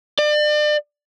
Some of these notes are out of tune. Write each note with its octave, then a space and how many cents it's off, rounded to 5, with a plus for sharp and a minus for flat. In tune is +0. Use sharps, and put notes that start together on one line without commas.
D5 +35